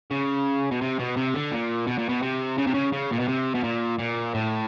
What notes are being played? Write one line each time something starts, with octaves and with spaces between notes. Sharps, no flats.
C#3
B2
C3
B2
C3
D3
A#2
B2
A#2
B2
C3
C#3
C3
C#3
C#3
A#2
B2
C3
B2
A#2
A#2
A2